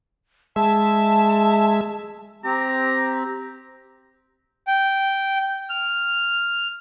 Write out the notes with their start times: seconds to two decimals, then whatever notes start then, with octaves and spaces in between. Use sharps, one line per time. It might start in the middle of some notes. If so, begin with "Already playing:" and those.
0.56 G#3 E5 A5
2.44 C4 G4 A#5
4.67 G5
5.70 F6